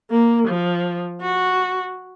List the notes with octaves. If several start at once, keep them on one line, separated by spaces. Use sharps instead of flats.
A#3
F3
F#4